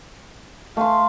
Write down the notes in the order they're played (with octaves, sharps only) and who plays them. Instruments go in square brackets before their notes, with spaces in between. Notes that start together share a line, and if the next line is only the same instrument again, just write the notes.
[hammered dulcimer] A3 C6 [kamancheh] F5